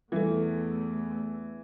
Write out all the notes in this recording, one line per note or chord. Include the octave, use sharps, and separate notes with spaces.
E2 E3 G3 A3 A4